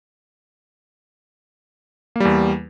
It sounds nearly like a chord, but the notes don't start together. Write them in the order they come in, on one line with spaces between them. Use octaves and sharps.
A#3 G3 E2